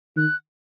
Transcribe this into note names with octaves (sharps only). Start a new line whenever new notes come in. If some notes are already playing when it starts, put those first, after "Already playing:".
D#3 F#6